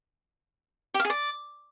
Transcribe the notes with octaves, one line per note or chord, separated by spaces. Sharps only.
G4
F5
G#4
D5